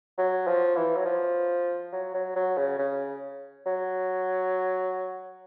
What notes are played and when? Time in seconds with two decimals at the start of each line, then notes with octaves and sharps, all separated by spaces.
0.18 F#3
0.47 F3
0.76 E3
0.97 F#3
1.05 F3
1.92 F#3
2.14 F#3
2.36 F#3
2.57 C#3
2.79 C#3
3.66 F#3